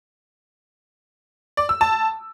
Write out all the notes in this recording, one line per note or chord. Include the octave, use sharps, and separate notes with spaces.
D5
E6
A5